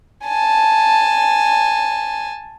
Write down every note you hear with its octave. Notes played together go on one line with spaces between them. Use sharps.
G#5 A5